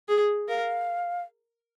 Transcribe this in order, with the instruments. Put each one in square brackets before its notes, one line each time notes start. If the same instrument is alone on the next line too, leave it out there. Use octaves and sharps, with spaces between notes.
[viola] G#4
[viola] A#4 [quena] F5